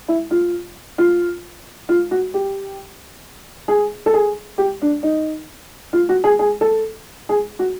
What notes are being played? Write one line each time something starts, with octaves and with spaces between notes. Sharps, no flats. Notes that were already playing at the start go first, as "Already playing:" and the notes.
E4
F4
F4
F4
F#4
G4
G#4
A4
G#4
G4
D4
D#4
F4
F#4
G#4
G#4
A4
G#4
F#4